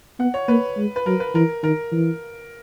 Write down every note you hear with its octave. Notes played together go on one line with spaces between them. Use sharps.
B3 F#5
C#5
A#3 B4
G#3
B4
F#3 A#4
B4
E3 A#4
D#3 A#4
E3